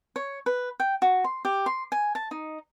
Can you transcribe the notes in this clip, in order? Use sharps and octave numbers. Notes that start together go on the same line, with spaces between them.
C#5
B4
G5
F#4
C6
G4
C6
G#5
A5
D#4